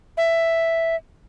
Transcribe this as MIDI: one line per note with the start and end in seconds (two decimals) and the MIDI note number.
0.17 0.96 76